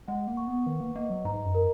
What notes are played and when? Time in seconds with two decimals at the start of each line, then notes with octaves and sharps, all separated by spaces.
0.08 G#3 F#5
0.27 A#3
0.37 C#6
0.47 B3
0.66 D#3 B4
0.81 A#3
0.95 A#3 D#5
1.10 F#3
1.25 G#2 A#5
1.45 F#2
1.55 A#4